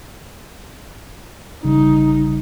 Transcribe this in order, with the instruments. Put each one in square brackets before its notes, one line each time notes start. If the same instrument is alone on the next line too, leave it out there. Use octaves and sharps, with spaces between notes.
[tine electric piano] A1 C#3 G3 [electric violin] D#4